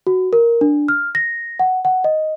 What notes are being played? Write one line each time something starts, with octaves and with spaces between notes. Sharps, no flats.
F#4
A#4
D4
F6
A#6
F#5
F#5
D#5